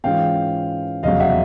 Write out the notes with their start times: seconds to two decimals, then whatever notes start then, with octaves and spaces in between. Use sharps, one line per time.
0.04 G#2 E3 G#3 C#4 F4 F5 G5
1.03 F1 E2 C#3 F#3 D#5 F5
1.20 E5 F#5